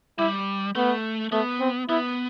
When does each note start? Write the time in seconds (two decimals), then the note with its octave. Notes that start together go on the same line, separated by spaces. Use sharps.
0.19 G3 E4
0.75 A3 B3
1.32 A3 B3
1.60 C4
1.89 B3 E4